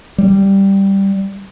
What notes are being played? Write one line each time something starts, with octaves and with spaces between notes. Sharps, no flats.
G3